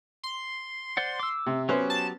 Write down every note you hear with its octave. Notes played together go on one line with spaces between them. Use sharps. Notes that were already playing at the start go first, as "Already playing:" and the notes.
C6
C5 D5 F#5
D6 E6
C3
F#3 B3 C#4 F#4 G4 C5
A5